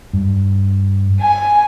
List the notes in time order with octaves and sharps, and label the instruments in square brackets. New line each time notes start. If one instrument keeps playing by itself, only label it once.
[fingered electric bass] G2
[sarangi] G#5